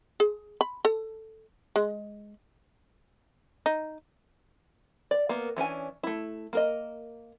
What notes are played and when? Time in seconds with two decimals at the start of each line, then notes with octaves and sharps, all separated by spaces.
0.20 G#4
0.61 B5
0.85 A4
1.76 G#3
3.66 D#4
5.11 D5
5.29 A#3 B3
5.57 E3 C#4 D4 G#5
6.03 A3 E4
6.53 A#3 A#4 D#5